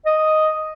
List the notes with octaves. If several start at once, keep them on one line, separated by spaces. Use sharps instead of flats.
D#5